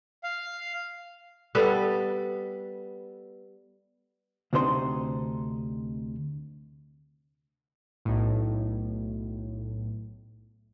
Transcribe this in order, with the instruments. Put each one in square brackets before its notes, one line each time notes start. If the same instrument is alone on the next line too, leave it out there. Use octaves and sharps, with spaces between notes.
[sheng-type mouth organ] F5
[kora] G3 B3 A4 B4
[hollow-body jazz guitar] D2 C3 D4 D#4 C5 C6
[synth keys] B1 A2